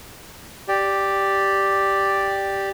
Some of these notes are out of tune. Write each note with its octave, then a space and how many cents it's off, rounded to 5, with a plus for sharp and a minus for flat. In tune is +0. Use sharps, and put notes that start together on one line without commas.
G4 +0 D5 +0